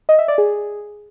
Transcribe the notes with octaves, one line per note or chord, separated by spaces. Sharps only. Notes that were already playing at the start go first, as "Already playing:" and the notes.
D#5
E5
D5
G#4